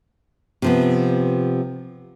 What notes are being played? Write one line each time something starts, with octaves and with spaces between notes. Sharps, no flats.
C3 F3 B3